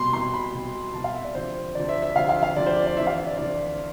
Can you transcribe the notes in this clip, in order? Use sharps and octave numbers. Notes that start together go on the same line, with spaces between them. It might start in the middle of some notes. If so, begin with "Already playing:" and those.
Already playing: C2 B2 B5 C6
C2 B2 C6
B5
C2 B2
C2 B2 A5
F5
E5
D5
D2 C3 F3 C5
D2 C3 F3 D5
E5
E5
D2 C3 F3 F5
F5
F5
D2 C3 F3 D5
C5
D5
D5
D2 C3 E3 E5
F5
D5
D2 C3 E3 D5